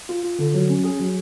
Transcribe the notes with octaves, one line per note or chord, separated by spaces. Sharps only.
F4
F4
D3
F#3
C#4
G#4
F#3